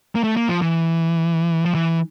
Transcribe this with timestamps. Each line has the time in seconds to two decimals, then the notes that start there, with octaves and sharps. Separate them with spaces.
0.15 A#3
0.24 A3
0.37 A#3
0.49 F3
0.62 E3
1.65 F3
1.75 E3